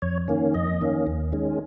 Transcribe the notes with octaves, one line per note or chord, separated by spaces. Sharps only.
F2 C#5
D#3 A#3 C#4
F2 D#5
D#3 A#3 C#4
D#2
D#3 G#3 C#4